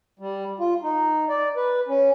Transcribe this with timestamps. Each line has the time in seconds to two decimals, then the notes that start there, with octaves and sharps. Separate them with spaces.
0.19 G3
0.60 F4
0.82 D#4
1.29 D5
1.56 B4
1.88 C#4